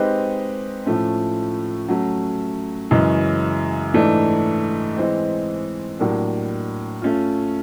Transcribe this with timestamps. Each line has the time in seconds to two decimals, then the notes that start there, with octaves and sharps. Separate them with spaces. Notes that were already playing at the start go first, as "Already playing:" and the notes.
Already playing: G#3 C4 D#4 G4 B4
0.86 A2 F3 A3 C#4
1.88 F#3 A3 C#4
2.91 F#2 C#3 E3 G#3 C#4
3.94 G#2 E3 A3 D4
4.97 E3 G#3 C4
5.99 A2 F#3 A#3 D4 G4
7.02 A3 C#4 F4